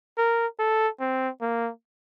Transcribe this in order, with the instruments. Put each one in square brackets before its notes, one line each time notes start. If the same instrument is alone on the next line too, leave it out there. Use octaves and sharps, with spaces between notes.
[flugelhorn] A#4
A4
C4
A#3